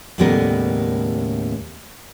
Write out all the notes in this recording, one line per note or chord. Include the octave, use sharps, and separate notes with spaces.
D#2 A2 C#3 G3 B3 A#4